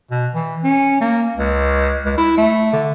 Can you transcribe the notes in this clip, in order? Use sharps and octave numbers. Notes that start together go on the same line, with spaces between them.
B2
E3
C#4
A#3
C#2
C#2
E4
A3
D3